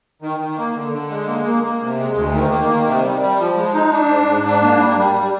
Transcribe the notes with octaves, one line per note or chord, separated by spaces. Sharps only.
D#3
D#3
A#3
D3
D3
G#3
A#3
A#3
A#3
C3
G#3
D2
D#3
A#3
D#3
C3
G3
G3
F3
G#3
D#4
D4
G#2
G#2
D4
A#3
G3
G3
G3